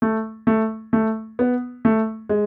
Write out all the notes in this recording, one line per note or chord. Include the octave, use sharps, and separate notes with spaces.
A3
A3
A3
B3
A3
G#3